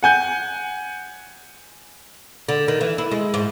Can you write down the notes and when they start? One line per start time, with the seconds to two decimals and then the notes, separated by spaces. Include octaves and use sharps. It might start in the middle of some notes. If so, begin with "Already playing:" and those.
0.03 F#5 G#5 G6
2.48 D3
2.68 D#3
2.81 E3
2.98 E4
3.11 G#3
3.34 G#2